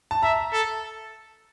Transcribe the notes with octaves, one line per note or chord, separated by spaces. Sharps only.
A5
E5 A#5
A4